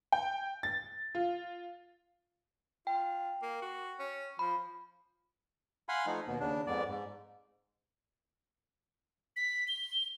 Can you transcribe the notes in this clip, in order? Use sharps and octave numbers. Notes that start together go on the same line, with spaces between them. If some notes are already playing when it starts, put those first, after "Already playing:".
G5
A6
F4
F4 G5
A#3
F#4
C#4
F3 B5
F5 F#5 G#5 B5 C6
F3 A3 D#4
D#2 B2 B3
D#2 C#3 D4
F2 G#2 B3 D5
G#2
B6
G7